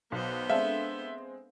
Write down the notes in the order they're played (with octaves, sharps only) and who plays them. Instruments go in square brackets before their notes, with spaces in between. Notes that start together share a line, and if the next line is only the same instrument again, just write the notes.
[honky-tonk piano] B1 [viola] B3 C5
[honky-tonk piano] G#3 C4 [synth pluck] D4 A4 F5 [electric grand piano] E5